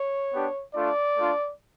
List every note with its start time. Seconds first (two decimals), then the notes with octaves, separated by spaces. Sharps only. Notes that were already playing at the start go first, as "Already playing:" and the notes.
Already playing: C#5
0.33 B3 D4 G4
0.75 A3 D4 F4 D5
1.17 A3 D4 F4